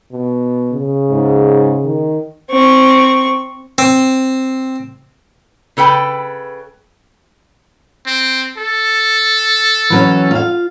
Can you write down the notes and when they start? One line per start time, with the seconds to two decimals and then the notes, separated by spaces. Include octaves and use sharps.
0.12 B2
0.73 C#3
1.10 G#2
1.84 D#3
2.50 C4 C#6
3.78 C4
5.77 C#3 A4 B4 G5
8.06 C4
8.57 A4
9.90 E3 F#3 C#4
10.31 F4 F5